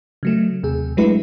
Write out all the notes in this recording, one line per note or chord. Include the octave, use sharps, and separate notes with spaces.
C#3 F#3 A3
D#2 C3 G#4
F#3 G#3 A3 D4 E4 B4